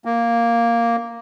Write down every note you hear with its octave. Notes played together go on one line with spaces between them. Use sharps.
A#3